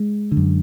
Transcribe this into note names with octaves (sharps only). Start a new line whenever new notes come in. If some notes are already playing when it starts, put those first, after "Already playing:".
Already playing: G#3
D3
F#2